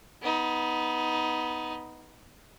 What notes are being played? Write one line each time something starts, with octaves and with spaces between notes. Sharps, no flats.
B3 D#4